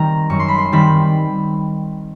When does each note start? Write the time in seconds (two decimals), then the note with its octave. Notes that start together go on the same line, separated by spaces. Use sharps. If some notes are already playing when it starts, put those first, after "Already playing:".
Already playing: D#3 G3 C4 A#5
0.30 F#2 C#6
0.39 C6
0.48 B5
0.58 C6
0.72 D#3 G3 C4 B5